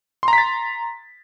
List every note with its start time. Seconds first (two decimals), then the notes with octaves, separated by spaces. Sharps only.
0.23 C6
0.28 A#5
0.33 B6
0.38 A6